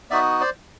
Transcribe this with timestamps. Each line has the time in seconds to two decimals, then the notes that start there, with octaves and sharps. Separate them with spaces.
0.10 B3 D#4 F#4 D5 E5
0.41 C5 D5